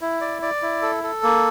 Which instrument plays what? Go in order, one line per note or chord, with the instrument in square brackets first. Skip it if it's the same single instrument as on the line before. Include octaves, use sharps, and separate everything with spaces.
[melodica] E4
D5
D5
E4
A4
A4
A#3